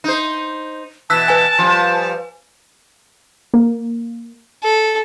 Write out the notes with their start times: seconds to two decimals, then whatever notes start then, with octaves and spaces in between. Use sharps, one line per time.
0.04 D#4 C5
1.10 B2 E3 A5 E6 F#6 B6
1.28 B4 G#5
1.59 F3 G3
3.54 A#3
4.63 A4